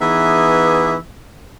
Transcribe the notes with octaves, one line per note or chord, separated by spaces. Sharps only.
E3 B3 D#4 G#4 E5